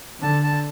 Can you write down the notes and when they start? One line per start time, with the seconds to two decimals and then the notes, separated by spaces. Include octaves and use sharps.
0.22 D3 A5
0.43 A5